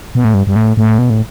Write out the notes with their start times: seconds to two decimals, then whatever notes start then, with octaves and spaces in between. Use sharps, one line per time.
0.15 B2
0.25 A2
0.34 G2
0.47 G2
0.56 A2
0.77 A2
0.98 B2
1.10 A2